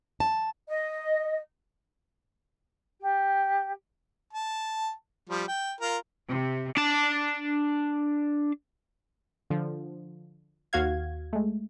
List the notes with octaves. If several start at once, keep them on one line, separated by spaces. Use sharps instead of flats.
A5
D#5
G4
A5
F3 G3
G5
F4 A#4
C3
D4 A5
D3 F3
D#2 F#4 F5 G#6
G#3 A3